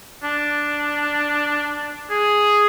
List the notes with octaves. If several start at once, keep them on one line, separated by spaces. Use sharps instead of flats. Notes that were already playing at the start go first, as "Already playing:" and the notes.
D4
G#4